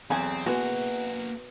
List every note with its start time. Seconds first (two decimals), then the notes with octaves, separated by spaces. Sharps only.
0.10 B1 E2 C4 G#4 A4 G#5
0.46 E3 G#3 A#3 B3 F#4 G#4 A4